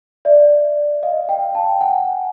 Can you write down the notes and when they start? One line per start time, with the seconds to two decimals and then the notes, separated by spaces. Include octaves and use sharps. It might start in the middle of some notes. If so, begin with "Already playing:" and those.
0.25 D5 E5
1.03 D#5 F5
1.29 F5 G5
1.55 G5 A5
1.81 F#5 G#5